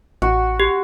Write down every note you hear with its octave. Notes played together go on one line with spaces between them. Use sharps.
A1 F#4
G4